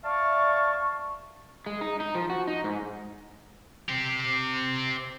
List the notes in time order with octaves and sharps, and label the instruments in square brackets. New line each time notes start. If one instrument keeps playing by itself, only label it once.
[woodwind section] D5 E5 F5 A5 C#6
[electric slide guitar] G#3
D#4
D#4
F3
F#4
D#4
G#2
[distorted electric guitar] C4 G4